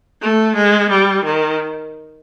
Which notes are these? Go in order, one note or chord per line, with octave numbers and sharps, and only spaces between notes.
A3
G#3
G3
D#3